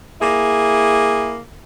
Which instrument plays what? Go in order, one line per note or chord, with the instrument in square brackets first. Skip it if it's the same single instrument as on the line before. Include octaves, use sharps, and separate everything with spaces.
[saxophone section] A#3 E4 G#4